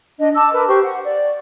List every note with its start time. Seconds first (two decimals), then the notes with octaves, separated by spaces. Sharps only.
0.17 D4 D#5
0.35 A5 D6 E6
0.53 A#4 B4
0.68 G4 C5 C#6
0.83 F#5
1.04 D5